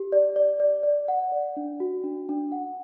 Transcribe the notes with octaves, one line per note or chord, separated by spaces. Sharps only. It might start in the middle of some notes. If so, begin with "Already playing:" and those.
Already playing: G4
D5
D5
D5
D5
F#5
D5
D4
F#4
D4
D4
F#5